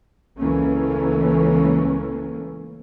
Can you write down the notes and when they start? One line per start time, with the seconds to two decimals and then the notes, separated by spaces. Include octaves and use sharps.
0.39 C#2 E3 A3 A#3 C#4